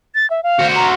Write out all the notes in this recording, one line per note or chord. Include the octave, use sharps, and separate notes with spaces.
A6
E5
F5
F#4 C5
A#5